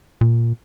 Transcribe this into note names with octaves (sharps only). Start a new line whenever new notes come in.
A#2